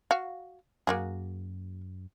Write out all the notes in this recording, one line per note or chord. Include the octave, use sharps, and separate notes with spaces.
F#4 F5
F#2 A#3 F#4 G#4